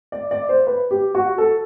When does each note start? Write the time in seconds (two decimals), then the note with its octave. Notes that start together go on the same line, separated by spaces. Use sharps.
0.12 D5
0.31 D5
0.49 C5
0.67 B4
0.91 G4
1.15 F#4
1.38 A4